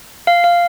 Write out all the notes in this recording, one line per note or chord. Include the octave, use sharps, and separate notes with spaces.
F5
F5